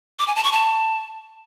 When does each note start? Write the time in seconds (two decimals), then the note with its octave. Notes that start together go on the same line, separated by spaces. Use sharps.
0.19 D6
0.27 G#5
0.36 A5
0.44 C#6
0.52 A5